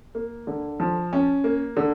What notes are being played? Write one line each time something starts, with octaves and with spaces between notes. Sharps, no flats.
A#3
D3
F3
C#4
A#3
D3